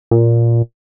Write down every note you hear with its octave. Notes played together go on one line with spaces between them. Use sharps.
A#2